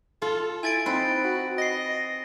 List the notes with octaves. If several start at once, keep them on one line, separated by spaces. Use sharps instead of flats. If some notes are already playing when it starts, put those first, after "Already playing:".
F4 A4
E4 G#5 A6 D7
C4 D#4 B4
F#4
D#5 A#6 C7